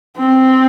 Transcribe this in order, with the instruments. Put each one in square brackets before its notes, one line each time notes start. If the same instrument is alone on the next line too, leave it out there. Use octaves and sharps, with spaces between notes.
[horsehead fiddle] C4